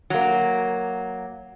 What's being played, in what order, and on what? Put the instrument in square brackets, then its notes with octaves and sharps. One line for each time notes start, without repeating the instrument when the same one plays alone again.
[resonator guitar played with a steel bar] F#3 A#3